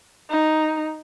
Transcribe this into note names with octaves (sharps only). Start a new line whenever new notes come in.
D#4